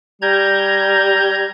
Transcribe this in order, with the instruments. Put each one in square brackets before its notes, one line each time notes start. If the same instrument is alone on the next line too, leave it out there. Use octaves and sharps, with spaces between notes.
[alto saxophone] G3 [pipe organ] A#5 G6 G#6